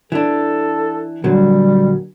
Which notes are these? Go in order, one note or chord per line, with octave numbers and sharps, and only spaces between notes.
E3 D4 A4
A#2 D3 F#3 G3